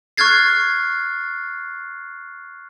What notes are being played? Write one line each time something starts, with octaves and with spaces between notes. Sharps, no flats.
C#6 F6 F#6 G#6 A6 C7